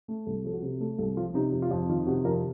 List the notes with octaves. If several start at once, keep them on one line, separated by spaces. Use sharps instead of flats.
A3
C2 A4
F3 A4
F#4
C3
A3 A4
C2 A4
F3 F4
C3 D#4
F2
F4
F2
D#3 F4
C3 F#4
F2 A#4